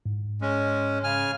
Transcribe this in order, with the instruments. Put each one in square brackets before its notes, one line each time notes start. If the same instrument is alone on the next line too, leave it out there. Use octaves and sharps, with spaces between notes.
[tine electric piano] G#2
[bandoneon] G#3 C#4
C#3 G#5 F6